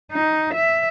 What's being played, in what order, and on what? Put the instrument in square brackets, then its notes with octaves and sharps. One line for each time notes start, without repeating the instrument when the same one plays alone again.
[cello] D#4
E5